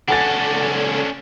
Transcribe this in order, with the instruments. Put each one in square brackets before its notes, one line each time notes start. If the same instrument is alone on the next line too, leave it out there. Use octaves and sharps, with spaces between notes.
[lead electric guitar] C#2 A4 [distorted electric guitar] C#4 D4 [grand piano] F#5 G#5 A6